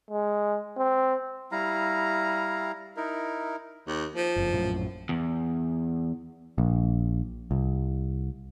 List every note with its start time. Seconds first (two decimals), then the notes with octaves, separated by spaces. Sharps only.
0.11 G#3
0.78 C4
1.52 G3 E4 F5 A#5
2.97 D#4 E4 A#4
3.87 D#2
4.16 F3
4.36 F#1 F2
4.53 A#1 F#2 A2
5.09 E2
6.58 A#1
7.51 C2